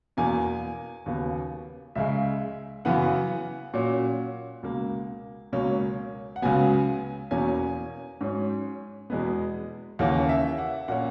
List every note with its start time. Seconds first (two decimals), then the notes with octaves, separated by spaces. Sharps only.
0.17 E2 B2 A#3 G#5
1.06 D#2 C#3 F#3 B3
1.95 C#2 C#3 G#3 E5
2.85 F#2 C#3 E3 B3 F#5
3.74 A#2 F#3 C#4
4.63 C#2 B2 A#3
5.53 C#2 B2 F#3 A#3 C#4
6.36 F#5
6.42 C#2 C#3 F#3 B3 G#5
7.31 E2 B2 A#3 C#4 G#5
8.21 G#2 F#3 C#4
9.10 E2 B2 G#3 B3
9.99 D#2 C#3 E3 A#3 C#4 F#5
10.29 E5
10.58 F#5
10.88 A#2 A#3 C#4 F#5